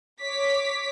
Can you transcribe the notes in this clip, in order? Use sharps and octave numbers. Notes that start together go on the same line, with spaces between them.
C#5 D6 B6